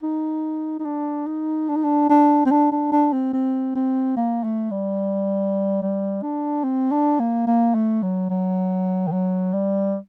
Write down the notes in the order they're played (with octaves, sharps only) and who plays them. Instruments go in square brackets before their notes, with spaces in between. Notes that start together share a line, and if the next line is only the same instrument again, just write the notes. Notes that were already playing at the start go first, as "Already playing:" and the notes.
[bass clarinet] D#4
D#4
D4
D#4
D4
D#4
D4
D4
C4
D4
D4
D4
C4
C4
C4
A#3
A3
G3
G3
D4
C4
D4
A#3
A#3
A3
F#3
F#3
D#3
F#3
G3